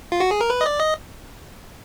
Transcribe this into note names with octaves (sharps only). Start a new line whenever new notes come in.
F4
F#4
G#4
A#4
B4
D#5
D5
D#5